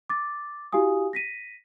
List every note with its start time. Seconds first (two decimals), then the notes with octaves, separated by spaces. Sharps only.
0.10 D6 A6
0.72 E4 F#4 G4 F5 G#5 D#6
1.13 A#6 B6 D#7